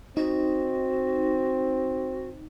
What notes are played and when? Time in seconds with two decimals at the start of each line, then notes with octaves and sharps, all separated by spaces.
0.17 C4 D#4 F#4